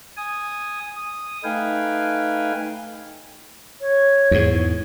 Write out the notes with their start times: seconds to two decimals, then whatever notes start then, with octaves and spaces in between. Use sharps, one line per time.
0.17 G#5 D#6
0.96 D#6
1.44 A3 D#4 B4 F5 G5 G#5
3.81 C#5
4.31 E2 G#2